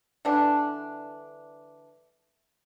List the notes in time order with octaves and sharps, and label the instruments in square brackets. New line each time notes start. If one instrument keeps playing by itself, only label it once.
[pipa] D3 E3 G3 D4